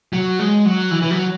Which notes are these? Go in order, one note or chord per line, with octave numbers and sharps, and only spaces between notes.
F#3
G#3
F#3
E3
E3
F#3